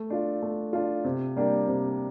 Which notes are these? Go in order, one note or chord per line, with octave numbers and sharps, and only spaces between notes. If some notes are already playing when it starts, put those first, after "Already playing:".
Already playing: A3
D4 F4
A3
D4 F4
C3
G3 A#3 D4 G4
C3